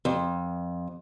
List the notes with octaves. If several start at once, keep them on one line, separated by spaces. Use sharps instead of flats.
F2